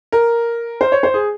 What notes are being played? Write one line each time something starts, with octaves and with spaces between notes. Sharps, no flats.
A#4
C5
C#5
C5
G#4